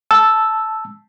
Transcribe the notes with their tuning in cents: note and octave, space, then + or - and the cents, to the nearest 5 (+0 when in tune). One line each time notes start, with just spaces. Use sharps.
A5 -5 E6 +0